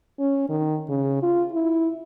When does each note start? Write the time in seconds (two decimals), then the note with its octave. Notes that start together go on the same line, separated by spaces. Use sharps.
0.19 C#4
0.49 D#3
0.89 C#3
1.23 F4
1.52 E4